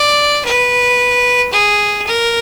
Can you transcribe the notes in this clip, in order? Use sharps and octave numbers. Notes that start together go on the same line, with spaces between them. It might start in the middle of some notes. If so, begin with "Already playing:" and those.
Already playing: D5
B4
G#4
A#4